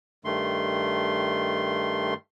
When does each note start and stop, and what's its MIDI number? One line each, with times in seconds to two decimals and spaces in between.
0.25 2.14 43
0.25 2.14 51
0.25 2.14 57
0.25 2.14 84